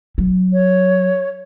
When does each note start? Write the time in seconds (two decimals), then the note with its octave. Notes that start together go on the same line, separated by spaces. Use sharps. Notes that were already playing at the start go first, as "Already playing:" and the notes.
0.18 F#3
0.53 C#5